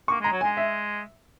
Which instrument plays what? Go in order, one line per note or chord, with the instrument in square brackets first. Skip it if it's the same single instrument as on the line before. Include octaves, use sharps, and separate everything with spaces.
[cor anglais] A#3 [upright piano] C#6
[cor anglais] G#3 [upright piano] A#5
[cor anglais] F#3
[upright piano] G#5
[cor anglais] G#3
[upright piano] E5